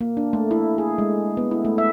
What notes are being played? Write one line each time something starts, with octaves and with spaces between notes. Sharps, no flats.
A#3
D4
A3
E4
G#4
G#3
B3
E4
A3
E5